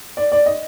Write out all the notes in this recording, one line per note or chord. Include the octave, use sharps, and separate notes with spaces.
D5
D5
D#5